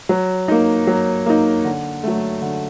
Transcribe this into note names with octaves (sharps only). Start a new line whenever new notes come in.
F#3
A#3 D#4
F#3
A#3 D#4
D3
F#3 A3
D3